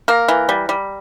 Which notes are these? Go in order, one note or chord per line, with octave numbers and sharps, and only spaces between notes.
A#3 A#4
E3
G3
G3